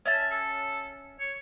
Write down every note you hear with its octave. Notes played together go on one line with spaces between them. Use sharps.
C#4 E5 A5
A4
C#5